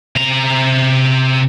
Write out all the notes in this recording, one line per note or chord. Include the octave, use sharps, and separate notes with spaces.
C3 A#5